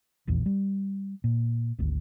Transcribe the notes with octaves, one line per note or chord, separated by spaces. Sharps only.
D#1 A#1 E2
G3
A#2
G#1 D2